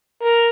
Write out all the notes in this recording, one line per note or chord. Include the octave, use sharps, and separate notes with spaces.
A#4